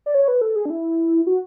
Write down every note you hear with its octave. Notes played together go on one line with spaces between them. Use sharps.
D5
C#5
B4
A4
G#4
D4
E4
F#4